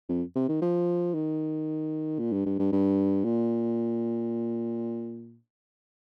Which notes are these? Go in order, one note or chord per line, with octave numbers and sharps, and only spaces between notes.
F2
C3
D#3
F3
D#3
A#2
G2
G2
G2
G2
A#2